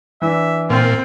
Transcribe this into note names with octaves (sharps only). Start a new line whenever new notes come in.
E3 D4 E5
A#2 C4 F4